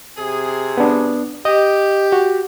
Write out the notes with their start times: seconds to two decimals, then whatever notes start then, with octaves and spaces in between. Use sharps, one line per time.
0.17 C3 G#4
0.77 B3 D4
1.45 G4 D#5
2.12 F#4